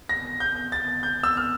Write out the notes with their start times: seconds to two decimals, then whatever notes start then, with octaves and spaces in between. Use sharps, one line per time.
0.09 A#6
0.40 G6
0.72 A6
1.03 G6
1.23 E6
1.37 F6